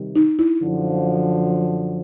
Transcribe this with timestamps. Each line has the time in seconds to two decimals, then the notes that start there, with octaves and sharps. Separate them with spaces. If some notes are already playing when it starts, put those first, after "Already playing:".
Already playing: C3 D#3 G3
0.16 D#4
0.39 E4
0.62 F#2 D3 F3